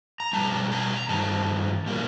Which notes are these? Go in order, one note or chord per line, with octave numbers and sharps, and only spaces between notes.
A#5
B2 G3 C4 A5
A#5
G2 D#3 G3 C4 A5
B2 G3 A#3